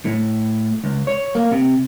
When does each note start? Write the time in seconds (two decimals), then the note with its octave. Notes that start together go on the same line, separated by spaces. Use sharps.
0.05 A2
0.84 C#2
1.07 C#5
1.35 A#3
1.52 C3